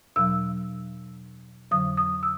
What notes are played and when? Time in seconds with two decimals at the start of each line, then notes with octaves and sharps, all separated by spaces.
0.16 E2 B2 F#3 E6
1.71 F2 D3 F#3 D#6
1.97 D#6
2.23 E6